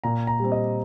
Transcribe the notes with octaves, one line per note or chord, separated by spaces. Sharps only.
A#2 A#5
A#5
G3 C4
D#5